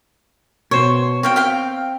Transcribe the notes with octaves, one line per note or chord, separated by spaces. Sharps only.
B2 C5 C#5
C4 C#5 F5 G5
F5 G5